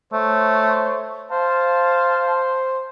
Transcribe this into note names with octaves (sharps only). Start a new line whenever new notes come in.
A3 C5 C#5
C5 F5 A5